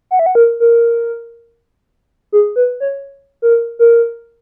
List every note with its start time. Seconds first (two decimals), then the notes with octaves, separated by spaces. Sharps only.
0.11 F#5
0.19 E5
0.26 F#5
0.35 A#4
0.60 A#4
2.32 G#4
2.56 B4
2.80 C#5
3.42 A#4
3.79 A#4